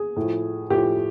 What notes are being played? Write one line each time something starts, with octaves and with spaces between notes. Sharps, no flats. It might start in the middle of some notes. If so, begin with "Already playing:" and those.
Already playing: G#4
A2 F3
A2 F3 G4